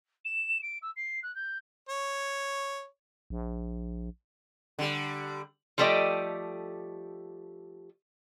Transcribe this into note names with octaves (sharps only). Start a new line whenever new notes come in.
E7
D7
E6
C7
F#6
G6
C#5
A#1
D3 G3
F3 G3 A3 G4 D5 D#5